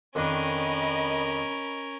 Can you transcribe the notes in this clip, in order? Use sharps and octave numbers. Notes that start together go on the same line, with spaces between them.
F2 D#3 C#4 D4 A#4 D#5 B5